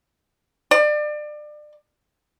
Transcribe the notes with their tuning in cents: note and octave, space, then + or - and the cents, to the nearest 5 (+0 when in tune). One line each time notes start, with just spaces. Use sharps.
D5 +30